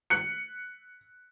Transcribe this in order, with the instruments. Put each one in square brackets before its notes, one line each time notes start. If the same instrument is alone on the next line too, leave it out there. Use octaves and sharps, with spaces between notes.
[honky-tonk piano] F#6 C#7